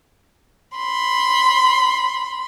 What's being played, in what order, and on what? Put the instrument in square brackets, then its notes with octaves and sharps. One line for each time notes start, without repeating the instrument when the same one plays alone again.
[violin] B5 C6